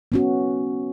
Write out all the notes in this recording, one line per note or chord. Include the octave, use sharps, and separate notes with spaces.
B3 C#4 F#4